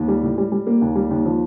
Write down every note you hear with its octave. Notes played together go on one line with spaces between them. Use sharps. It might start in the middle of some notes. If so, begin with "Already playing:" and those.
Already playing: D#2
G3
A2
G3
G3
A#3
D#2
G3
D#2
F3